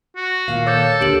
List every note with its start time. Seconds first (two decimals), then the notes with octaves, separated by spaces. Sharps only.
0.16 F#4
0.48 A#2 D#3 F5
0.66 A4 C#5 D6 G6
1.01 D#2 D3 A#3 G4 D7 F#7